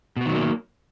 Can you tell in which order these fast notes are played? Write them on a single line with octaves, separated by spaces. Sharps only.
B2 B3 D#3 F#3 A#3